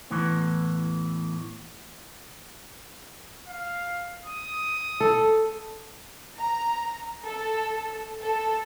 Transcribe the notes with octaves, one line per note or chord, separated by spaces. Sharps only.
E2 A2 E3
F5
D#6
A4
A#5
A4
A4